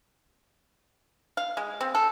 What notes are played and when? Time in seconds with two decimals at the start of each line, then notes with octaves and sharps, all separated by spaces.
1.37 F5
1.57 G#3
1.81 C4
1.95 A4